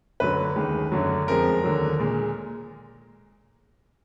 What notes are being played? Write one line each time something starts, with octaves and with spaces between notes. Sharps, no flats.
F#2 D3 F#3 B4
D#2 D#3 G#3
F#2 D3 F#3
F2 F3 G#3 A#4
D#2 D3 F#3
A#2 G#3